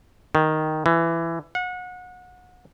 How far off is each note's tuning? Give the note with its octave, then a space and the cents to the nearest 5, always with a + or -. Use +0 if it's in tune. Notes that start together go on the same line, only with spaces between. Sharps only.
D#3 +0
E3 +15
F#5 -30